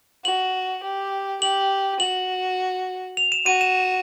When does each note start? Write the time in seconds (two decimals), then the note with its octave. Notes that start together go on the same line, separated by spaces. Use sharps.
0.25 F#4 F#7
0.83 G4
1.41 G4 F#7
2.00 F#4 F#7
3.17 F7
3.32 E7
3.46 F#4 D#7
3.61 E7